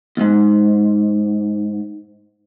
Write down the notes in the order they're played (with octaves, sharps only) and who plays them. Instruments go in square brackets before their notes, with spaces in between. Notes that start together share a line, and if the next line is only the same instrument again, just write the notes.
[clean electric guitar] D#2 G#2